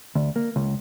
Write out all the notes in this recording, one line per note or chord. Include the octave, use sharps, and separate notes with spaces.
D2
A#3
C#2